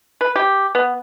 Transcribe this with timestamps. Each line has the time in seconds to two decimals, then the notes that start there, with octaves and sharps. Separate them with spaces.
0.21 B4
0.36 G4
0.75 B3